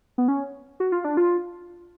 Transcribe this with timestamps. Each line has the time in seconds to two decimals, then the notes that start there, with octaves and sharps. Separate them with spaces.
0.18 B3
0.28 C#4
0.80 F#4
0.92 F4
1.04 D4
1.17 F4